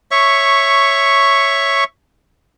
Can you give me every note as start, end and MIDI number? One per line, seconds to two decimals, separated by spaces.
0.11 1.84 73
0.11 1.84 76
0.11 1.84 85